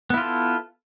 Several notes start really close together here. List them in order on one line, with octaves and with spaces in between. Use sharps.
B3 E4 F4 A4